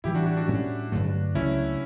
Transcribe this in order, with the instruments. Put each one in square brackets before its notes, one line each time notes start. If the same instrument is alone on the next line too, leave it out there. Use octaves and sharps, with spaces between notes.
[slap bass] A2 E3 G3 [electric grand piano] E4 G4
[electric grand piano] D4 F#4
D4 F#4
D4 F#4
[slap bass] A2 G3 C#4
G2 D3 F#3 A3
[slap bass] C#2 C#3 F#3 A3 [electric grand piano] C#4 E4